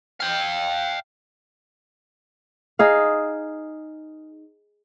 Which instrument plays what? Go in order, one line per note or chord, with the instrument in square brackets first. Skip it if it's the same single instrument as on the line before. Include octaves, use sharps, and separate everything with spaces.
[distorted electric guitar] F5 G5
[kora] D#4 G#4 F5